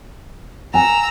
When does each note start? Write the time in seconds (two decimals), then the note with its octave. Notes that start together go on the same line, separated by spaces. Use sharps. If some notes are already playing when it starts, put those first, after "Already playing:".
0.74 F#5 G#5 A#5 E6